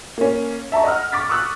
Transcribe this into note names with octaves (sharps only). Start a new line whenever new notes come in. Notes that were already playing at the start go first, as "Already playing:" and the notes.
A#3 C#4
E5 A5 A#5 C#6
D#5 F#5 E6 F6
C#6 D6 A6 B6
C#6 D#6 E6 F#6